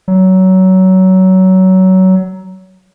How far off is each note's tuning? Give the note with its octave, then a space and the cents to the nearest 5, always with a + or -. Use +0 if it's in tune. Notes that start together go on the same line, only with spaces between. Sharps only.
F#3 +20